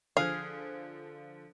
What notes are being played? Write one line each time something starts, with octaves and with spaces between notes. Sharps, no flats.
D3 F3 G#4 F5 F#6